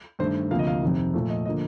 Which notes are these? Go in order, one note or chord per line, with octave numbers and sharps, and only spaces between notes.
G2 D#3 A3 C5
D2 C3 F3 A#3 F5
D#5
F5
F2 C3 D#3
A#2 F3 A3
D#5
D3 F3 A#3 D#5